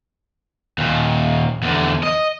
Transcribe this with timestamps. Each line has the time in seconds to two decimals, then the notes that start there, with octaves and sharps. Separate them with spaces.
0.78 D#2 A#2
1.62 E2 D3
2.03 D#5